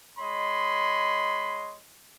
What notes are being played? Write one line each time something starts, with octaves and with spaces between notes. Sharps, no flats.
G#3 C#5 D#5 B5 C6